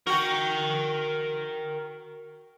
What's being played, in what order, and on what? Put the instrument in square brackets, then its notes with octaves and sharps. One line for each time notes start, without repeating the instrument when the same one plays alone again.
[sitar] F#4 [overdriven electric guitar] A#4 G5